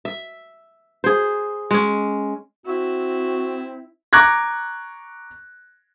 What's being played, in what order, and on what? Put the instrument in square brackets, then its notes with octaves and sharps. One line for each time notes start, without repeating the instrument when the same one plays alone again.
[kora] E5
G#4 C5
G#3 C#4
[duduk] C4 [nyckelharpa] E4 [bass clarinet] F#4
[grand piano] A#5 C#6 D6 F#6 G#6 A#6